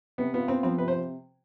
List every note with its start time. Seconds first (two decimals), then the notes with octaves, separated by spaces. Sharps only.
0.18 C3 B3
0.33 B3 F4
0.48 B3 C4
0.63 F3 C4
0.78 C3 B4
0.88 C5